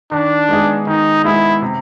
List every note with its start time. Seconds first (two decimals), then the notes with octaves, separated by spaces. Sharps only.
0.11 D#3 D4
0.49 G#3 B3 D#4 G#4
0.87 D#3 D#4
1.24 G#3 B3 D#4 E4 G#4
1.62 C3